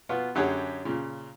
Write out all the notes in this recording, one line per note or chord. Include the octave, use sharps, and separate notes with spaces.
B2 B3 F4
F#2 D3 G4 G#4 C#5 F#5
A#2 C#3